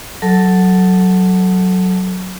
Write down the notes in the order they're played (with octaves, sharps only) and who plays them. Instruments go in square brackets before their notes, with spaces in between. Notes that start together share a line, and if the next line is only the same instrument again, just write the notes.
[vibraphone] F#3 A4 A5